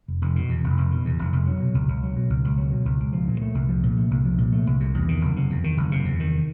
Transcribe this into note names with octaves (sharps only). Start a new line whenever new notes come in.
F1
F1
B2
E2
F1
F1
B2
E2
F1
F1
F#3
B2
C#2
C#2
F#3
B2
C#2
C#2
F#3
B2
C#2
C#2
F3
A#2
A3
C2
F3
A#2
A3
C2
F3
A#2
A3
C2
C3
E2
D#3
F#1
C3
E2
D#3
F#1
C3
E2
D#3